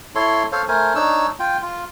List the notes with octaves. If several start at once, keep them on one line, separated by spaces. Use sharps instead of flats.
E4 A4 C#5 C6
A4 C5 C#5 F5
A3 A#4 C5 G#5
D4 D#4 C#5 E6
F4 G5
F4